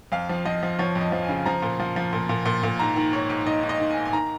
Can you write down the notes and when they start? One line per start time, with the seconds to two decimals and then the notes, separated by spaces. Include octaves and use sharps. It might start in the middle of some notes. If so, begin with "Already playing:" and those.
0.12 F2 F5
0.29 F3
0.45 F3 D#5
0.63 F3
0.79 F3 C#5
0.96 F2
1.01 D#5
1.12 F3
1.23 G#5
1.29 C#3
1.46 F3 A#5
1.62 A#2
1.80 F3
1.96 F3
2.13 A#2
2.29 A#2
2.46 A#2
2.63 A#2
2.79 G#2 A#5
2.96 D#3
3.13 G#2 C#5
3.30 G#2
3.46 D#3 D#5
3.63 G#2
3.69 D#5
3.80 D#3
3.91 G#5
3.97 G#2
4.05 G#5
4.13 D#3 A#5